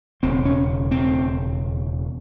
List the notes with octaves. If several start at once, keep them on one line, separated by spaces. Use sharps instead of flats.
E1 D#2 C#3 C4
C#4
C4